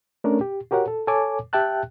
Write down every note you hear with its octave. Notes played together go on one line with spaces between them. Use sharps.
A3 C#4 D4 A#4
G4
F#4 G4 A#4 C#5 F#5
A4
A4 C#5 G#5 A5 D6
G4 E5 G5 A5 F#6